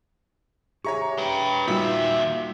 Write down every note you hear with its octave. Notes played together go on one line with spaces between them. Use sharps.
G4 G#4 C#5 E5 A#5 C#6
B4 G5
D#2 A#2 G3 D#4 F4 F#4 E5